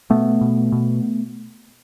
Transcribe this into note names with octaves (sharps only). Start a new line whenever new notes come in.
B2 A3 B3
B2
B2